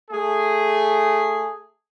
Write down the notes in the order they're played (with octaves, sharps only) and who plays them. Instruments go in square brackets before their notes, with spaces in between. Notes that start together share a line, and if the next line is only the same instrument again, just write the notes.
[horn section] A3 G#4